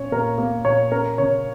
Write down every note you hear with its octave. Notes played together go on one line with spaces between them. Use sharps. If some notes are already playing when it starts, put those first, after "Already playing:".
Already playing: A#2 C#4 C#5
A#2 A#4
A#3
A#2 C#5
C#4 A#4
C#3 C#5